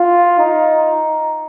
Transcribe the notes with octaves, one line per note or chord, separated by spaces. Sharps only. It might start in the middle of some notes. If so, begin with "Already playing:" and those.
Already playing: F4
D#4